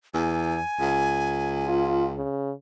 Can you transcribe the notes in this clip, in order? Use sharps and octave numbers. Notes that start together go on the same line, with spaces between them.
E2 G#5
C#2
F4
C#3